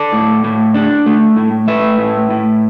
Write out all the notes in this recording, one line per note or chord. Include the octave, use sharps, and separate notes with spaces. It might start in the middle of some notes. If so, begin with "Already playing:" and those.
Already playing: A4 D5
A2
A2
D4
A3
A2
A3 B4 E5
A2
A2